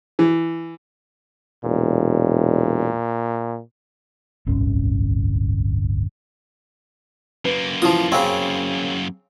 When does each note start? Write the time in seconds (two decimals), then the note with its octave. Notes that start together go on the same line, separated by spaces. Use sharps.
0.19 E3
1.64 E1 A#2
4.47 D1 G1 C2 C#4
7.45 F#2 A#3 B4
7.82 E3 F3 F4 D#6
8.12 C#3 C4 C#5 F5